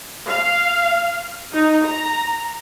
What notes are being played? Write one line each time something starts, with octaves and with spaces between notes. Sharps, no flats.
F5
D#4
A#5